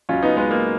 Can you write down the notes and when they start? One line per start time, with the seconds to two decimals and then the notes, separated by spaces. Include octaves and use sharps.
0.09 C#2 C#3 F#3 C#4 F4
0.22 B3 D#4
0.37 G#3 B3
0.51 A#3